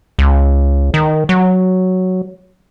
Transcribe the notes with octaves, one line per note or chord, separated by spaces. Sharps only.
C#2
D#3
F#3